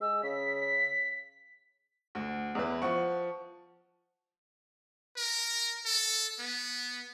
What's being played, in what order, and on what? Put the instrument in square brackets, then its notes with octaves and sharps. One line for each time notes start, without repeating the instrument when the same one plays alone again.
[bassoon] G#3 [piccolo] E6
[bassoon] C#3 [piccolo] B6
[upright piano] D2
E2 E4 B4
F3 F#5 C#6
[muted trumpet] A#4
A4
B3